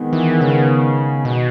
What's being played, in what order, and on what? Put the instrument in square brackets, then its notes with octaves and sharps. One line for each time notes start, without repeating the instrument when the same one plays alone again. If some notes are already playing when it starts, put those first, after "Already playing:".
Already playing: [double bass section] D#3 G#3 B3
[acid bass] E3
C#3
B2